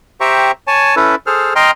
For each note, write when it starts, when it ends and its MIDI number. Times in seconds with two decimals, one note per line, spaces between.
0.21 0.51 67
0.21 0.51 72
0.21 0.51 76
0.21 0.51 79
0.21 0.51 82
0.21 0.51 85
0.67 0.95 73
0.67 0.95 80
0.67 0.95 81
0.96 1.15 61
0.96 1.15 64
0.96 1.15 69
0.96 1.15 71
1.27 1.54 68
1.27 1.54 69
1.27 1.54 72
1.27 1.54 89
1.56 1.71 75
1.56 1.71 79
1.56 1.71 82
1.56 1.71 84
1.56 1.71 89